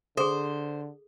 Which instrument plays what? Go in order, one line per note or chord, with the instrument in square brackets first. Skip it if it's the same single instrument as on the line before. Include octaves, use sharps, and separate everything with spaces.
[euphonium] D3 [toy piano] G#4 A4 [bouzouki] C5